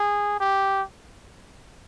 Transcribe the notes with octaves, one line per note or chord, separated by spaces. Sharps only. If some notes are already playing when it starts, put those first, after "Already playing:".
Already playing: G#4
G4